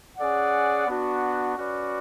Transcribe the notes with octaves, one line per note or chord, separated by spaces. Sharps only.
C#4 G#4 D5 F#5
B3 D4 F#4
C#4 F#4 B4 D5